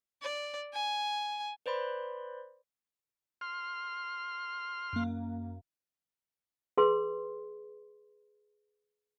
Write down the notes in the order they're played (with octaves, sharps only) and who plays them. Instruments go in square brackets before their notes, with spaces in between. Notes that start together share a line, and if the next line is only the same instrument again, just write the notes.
[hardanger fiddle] D5
G#5
[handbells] B4 C5 D5 B5 C6
[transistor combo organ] C6 F6
[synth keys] F#2 A#3
[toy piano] G#4 B4 C6